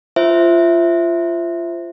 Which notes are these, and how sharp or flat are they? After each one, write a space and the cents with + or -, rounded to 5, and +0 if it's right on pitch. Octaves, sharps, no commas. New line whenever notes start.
F4 -20 C5 +0 E5 +0